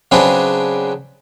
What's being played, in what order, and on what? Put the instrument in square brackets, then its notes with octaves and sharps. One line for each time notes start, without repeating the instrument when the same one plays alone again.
[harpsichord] C#3 F#3 C4 D4 G#4 B4